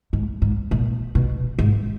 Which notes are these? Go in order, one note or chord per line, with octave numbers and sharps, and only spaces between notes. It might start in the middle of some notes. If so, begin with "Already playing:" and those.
G#2
G#2
A#2
B2
G#2